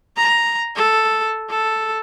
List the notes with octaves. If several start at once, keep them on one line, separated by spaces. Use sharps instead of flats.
A#5
A4
A4